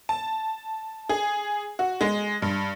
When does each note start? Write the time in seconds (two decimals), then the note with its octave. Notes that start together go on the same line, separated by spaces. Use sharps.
0.09 A5
1.09 G#4
1.79 F#4
2.01 G#3
2.42 G2